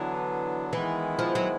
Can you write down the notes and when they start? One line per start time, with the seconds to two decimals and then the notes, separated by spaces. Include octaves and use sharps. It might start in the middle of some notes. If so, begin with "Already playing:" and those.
Already playing: D3 E3 F#3 B3 D4
0.73 D#3 E3 G#3 B3 E4
1.19 F3
1.35 F#3